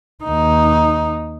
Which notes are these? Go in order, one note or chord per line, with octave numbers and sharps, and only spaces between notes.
D#2 D#4